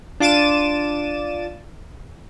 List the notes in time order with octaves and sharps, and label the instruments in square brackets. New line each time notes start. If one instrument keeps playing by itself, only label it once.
[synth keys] D4 F4 D6 A6 D#7 E7